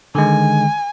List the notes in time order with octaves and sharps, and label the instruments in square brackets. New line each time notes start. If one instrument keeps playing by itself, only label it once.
[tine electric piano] D3 D#3 G#3 [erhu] G#5